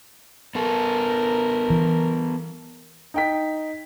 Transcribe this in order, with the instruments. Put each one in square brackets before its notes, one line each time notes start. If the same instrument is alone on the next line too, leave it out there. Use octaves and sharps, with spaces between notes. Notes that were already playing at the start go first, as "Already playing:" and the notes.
[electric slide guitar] B3 A4 [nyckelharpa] A#4
[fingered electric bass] E3
[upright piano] D#4 G5 B6